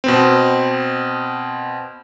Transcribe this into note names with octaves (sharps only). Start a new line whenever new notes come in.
B2 B3 C4